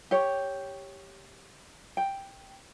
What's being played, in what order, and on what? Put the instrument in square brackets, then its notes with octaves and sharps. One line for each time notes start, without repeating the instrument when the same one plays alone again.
[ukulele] G4 C#5
G5